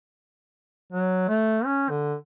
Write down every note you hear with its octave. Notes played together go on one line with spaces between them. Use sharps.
F#3
A3
C#4
D3